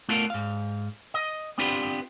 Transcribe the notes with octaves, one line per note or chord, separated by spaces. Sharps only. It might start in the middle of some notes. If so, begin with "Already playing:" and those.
A3 B3 F4 A4 A#4 F5
G#2 F5
D#5
B3 C4 D4 F4 G4 B4